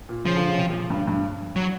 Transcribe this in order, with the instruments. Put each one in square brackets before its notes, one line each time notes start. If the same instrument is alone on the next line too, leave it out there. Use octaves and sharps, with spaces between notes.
[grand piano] A#2
[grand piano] C#3 [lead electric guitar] F3
[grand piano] D3
C#3
C3
A#2
G2
G2
[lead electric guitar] F#3